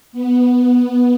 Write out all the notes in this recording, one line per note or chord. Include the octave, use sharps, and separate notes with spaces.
B3